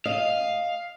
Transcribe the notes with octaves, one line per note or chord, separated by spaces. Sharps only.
D#5 F5